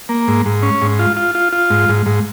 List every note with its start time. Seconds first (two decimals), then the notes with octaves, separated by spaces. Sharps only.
0.09 A#3
0.28 G#2
0.46 G#2
0.63 C#4
0.82 G#2
0.99 F4
1.17 F4
1.35 F4
1.53 F4
1.70 G#2
1.89 G#2
2.06 G#2